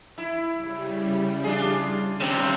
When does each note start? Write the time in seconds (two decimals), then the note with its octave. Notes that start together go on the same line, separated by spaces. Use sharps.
0.18 E4
0.55 C#3 G3
1.44 D4 F4 G#4
2.21 C#3 C4 F5 A#5 C#6